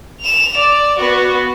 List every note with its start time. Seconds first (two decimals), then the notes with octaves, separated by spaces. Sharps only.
0.21 E7 F7
0.57 D5
0.98 B3 F#4